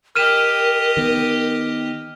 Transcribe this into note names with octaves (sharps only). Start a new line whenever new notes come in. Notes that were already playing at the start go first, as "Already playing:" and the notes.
G4 A#4 D#5 F6 D#7 E7
D#3 B3